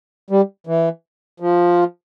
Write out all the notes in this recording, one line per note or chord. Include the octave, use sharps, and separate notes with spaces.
G3
E3
F3